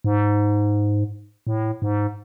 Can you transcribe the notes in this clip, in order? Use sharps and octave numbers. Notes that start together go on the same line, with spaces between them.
G#2
A2
G#2